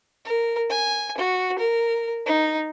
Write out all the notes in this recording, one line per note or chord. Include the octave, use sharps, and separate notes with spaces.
A#4
G#5
F#4
A#4
D#4